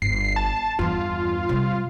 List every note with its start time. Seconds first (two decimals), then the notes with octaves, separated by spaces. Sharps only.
0.02 G1 C7
0.36 A5
0.79 E2 G2 F4
1.49 C3 G3